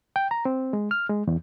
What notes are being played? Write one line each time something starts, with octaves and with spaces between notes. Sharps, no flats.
G5
A#5
C4
G#3
F6
G#3
E2